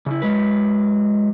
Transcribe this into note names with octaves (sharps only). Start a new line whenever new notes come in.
C#3 E4
F#3 G#3 B4